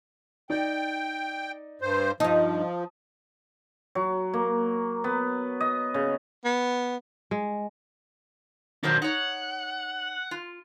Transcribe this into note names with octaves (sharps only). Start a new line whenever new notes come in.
D#4 D5 G5
G2 C5
G2 F3 D#4 A5 D#6
F#3
A#3
B3
D#5
C#3
B3
G#3
D#3 F#3 D4 A#4 C5
D#4 C#5 F#5
F4